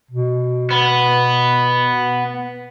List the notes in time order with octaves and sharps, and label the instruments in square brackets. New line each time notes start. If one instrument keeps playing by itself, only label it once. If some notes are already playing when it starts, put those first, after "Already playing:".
[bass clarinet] B2
[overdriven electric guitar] B3